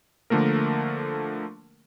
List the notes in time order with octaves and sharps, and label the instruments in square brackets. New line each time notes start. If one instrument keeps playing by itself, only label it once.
[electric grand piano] D3 F3 A3 A#3 A#4